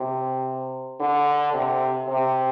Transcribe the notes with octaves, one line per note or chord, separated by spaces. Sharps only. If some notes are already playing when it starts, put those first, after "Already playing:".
Already playing: C3
D3
C3
C3